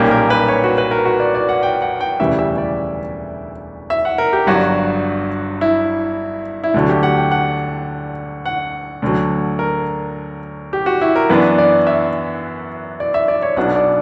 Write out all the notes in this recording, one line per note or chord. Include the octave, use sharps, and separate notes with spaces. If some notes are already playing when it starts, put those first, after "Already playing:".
Already playing: B1 A#2 G3 A#3 C#4 G4
A#4
B4
C#5
F#4
B4
A#4
F#4
D5
D5
F#5
G5
F#5
G5
E1 D2 C#3 E3 G3 E5
E5
D5
E5
F#5
A#4
G4
G1 G2 F#3 F#4
E4
E4
D2 D3 F#3 F#4
G4
F#5
G5
F#5
F#5
D2 D3 F#3
A#4
G4
F#4
E4
A#4
F#2 E3 B3 D4 B4
D5
E5
D5
E5
D5
C#5
B1 B2 F#3 B3 D4 F#5
D5